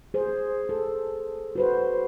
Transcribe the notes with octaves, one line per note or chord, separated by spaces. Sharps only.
G#4 C5
A4
F#4 B4 C5